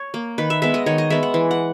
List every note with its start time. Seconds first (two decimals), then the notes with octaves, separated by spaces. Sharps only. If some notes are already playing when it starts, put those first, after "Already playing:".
Already playing: C#5
0.14 A#3
0.38 D#3 B4
0.50 E5
0.62 G#3 B3 E5
0.74 D#5
0.86 D#3 C#5
0.98 D#5
1.10 G#3 B3 E5
1.23 F#5
1.34 E3
1.51 F#5